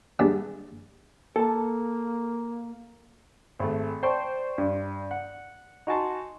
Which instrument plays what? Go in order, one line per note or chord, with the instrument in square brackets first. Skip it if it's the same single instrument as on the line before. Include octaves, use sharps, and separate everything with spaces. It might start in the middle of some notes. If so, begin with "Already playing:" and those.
[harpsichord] G3 G#3 B3 D4
[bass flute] A#3 [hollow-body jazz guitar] A4 A5
[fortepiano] G#1 A3
C5 D5 G5 A5 C6 C#6
G2
F#5
D#4 F#4 G#5 A5 C6